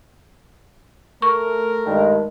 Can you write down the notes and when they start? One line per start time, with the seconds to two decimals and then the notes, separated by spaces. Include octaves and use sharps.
1.22 A3 A#4 C#6
1.86 G2 D#3 G#3